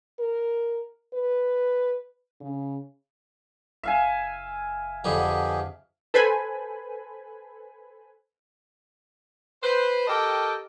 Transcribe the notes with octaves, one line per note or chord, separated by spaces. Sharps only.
A#4
B4
C#3
F#1 E5 F5 G#5
F2 D3 B3 G4 G#4
A4 B4 C5 G#5 B5
B4 C5
G4 A4 A#4 D#5 G5 A5